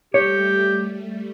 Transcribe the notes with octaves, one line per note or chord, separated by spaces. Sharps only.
G3 A3 G4 C#5